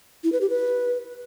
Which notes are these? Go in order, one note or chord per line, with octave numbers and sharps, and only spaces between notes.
E4
B4
G4
B4